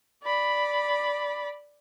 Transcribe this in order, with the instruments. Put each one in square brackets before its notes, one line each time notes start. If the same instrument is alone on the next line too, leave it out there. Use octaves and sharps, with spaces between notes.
[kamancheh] D5 B5